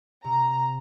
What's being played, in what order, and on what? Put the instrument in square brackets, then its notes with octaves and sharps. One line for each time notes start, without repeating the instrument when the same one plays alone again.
[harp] C3 [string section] A#5